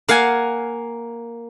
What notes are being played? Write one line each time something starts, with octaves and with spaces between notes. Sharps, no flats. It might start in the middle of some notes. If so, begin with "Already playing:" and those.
A#3 F5 F#5 G#5